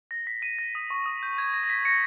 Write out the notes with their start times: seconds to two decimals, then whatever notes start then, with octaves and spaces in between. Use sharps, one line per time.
0.11 A#6
0.27 B6
0.42 B6 D#7
0.59 A#6
0.75 D#6
0.90 C#6
1.06 D#6
1.23 G6
1.38 G#6
1.53 A#6
1.63 A#6
1.69 B6
1.85 A#6 C#7